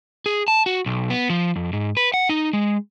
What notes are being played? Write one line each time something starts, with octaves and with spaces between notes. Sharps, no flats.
G#4
A5
F#4
B1
B3
F3
F2
G#2
B4
F#5
D#4
G#3